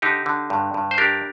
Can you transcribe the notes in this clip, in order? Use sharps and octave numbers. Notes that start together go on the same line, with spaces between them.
D3 D#4 G4
D3
G2
G2
C5
D4 G4 A#4